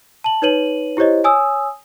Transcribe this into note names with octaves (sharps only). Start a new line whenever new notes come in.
A5 F#7
D#4 B4 C#5 D#7 F#7
E4 G4 C5 C#5 D#5
C#5 G#5 D#6 E6